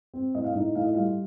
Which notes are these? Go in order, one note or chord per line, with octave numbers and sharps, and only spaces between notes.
C4
A2 D#5
F5
A2 D#4 D#5
A2 F5
D#5
G3 F4 F5